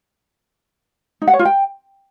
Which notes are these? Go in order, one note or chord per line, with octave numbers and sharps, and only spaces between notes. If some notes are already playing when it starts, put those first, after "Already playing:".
D#4
F#5
C#5
F4
G5